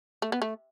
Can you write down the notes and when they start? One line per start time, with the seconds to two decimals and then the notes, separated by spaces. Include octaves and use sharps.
0.22 A3
0.32 B3
0.42 A3